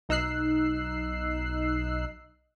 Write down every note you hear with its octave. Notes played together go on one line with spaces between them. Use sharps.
B1 D#4 E6 F#6 C7